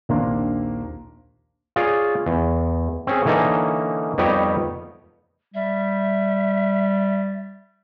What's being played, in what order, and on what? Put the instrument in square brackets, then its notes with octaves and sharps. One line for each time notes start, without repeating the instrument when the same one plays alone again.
[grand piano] A#1 D#2 A#3 C4 D4 C6
[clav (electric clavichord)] F4 G#4 C#5 D5
E2
C4 C#4 G#4
D3 E3 A#3 C#4 D#4 A4
F2 G3 B3 D#4 G4 C#5
[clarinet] G3 [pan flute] E5